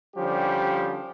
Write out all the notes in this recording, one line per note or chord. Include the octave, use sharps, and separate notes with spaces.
D3 F3 G3 C#4 G4